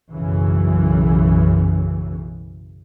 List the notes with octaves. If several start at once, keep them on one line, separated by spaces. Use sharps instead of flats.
B1 F#2 C#3 E3